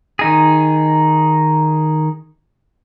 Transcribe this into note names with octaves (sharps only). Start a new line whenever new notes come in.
D#3 D#4 G#4